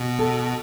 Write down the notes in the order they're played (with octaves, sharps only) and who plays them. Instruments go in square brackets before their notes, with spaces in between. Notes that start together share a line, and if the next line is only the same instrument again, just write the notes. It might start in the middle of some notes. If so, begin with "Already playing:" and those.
Already playing: [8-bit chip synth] B2
[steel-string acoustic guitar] A4